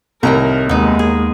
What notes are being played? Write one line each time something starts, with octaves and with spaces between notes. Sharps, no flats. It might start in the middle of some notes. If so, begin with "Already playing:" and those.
C2 A2 D#3 A#4 A#5
D#2 G#3 A#3 B3 D#4
G#4